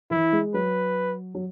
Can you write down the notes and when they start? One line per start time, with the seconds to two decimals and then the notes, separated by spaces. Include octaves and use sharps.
0.11 E3 E4
0.32 G#3
0.54 F#3 B4
1.35 F#3